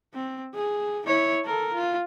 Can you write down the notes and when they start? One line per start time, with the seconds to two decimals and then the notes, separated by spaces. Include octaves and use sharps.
0.14 C4
0.54 G#4
1.07 E4 C#5
1.45 A4 A#4
1.74 F4